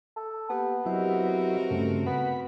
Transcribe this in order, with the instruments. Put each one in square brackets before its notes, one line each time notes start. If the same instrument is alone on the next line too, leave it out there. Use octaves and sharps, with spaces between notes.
[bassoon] A4
[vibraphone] A#3 G4 [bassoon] B3
[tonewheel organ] F#3 E4 [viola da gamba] C4 F#4 A#4 [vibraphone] G4 C5 D#5
[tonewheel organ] G2 C#3 A3
[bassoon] B3 [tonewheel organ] B5